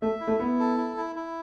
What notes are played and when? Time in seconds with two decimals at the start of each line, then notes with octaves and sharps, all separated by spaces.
0.02 A3 E5
0.21 E4
0.27 A3
0.39 B3 E4
0.59 A4
0.77 E4
0.97 E4
1.16 E4